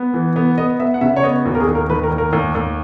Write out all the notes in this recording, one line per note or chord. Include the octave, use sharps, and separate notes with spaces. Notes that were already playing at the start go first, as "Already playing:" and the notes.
Already playing: B3
E3
B3
B3 D#5
B3 E5
F#5
C#3 E5
C#5
B3 D#5
D#2 F#4
A#4
G#4
D#2
A#4
D#3 B4
A#4
D#2
A#4
D#2
D#2